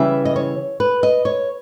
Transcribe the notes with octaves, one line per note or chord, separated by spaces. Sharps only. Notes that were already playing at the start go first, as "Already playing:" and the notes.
Already playing: C#3 E3 G3 E5
D#5
C#5
B4
D#5
C#5